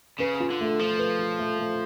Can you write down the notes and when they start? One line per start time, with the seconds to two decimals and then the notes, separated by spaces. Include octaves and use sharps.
0.20 C#3 B4
0.40 F4
0.51 D3
0.61 A3
0.79 F3 A3
0.99 B4
1.19 F4
1.39 A3
1.59 A3